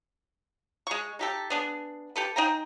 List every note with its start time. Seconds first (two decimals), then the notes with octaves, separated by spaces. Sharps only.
0.87 G#3 C#6
1.19 D#4 G4 A4
1.50 B3 D4 G#4
2.16 G4 A4 B4
2.36 D#4 G5 G#5 A#5